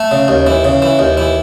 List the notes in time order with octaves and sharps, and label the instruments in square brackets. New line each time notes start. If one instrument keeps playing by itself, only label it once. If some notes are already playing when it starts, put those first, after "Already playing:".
Already playing: [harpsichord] A3
C#3
D#2
E3
C#3
E3
D#2
E3